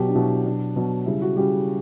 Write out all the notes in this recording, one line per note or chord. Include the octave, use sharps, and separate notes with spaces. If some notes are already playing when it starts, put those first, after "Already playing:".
Already playing: B2 F#3 G4
D4
B2 F#3 E4
B2 F#3 D4
B2 F#3
C#3 G3 E4
F#4
C#3 G3 G4